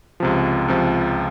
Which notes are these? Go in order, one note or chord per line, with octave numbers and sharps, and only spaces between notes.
C#2 C3 F3
C#2 C3 F3